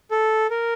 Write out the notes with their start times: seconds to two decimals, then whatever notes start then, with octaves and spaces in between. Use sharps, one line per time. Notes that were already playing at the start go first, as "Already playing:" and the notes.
0.11 A4
0.50 A#4